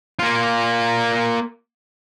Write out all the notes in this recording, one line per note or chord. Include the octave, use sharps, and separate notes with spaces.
A#3 F4